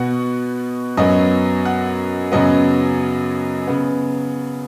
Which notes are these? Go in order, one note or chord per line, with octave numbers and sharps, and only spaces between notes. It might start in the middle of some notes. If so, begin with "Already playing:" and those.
Already playing: B2 B3 F#4
F#2 F#3 B3 D#5
F#5
F#2 C#3 F#3 B3 D#5
C#3 B3